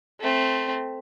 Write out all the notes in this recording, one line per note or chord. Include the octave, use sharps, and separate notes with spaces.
A3 C4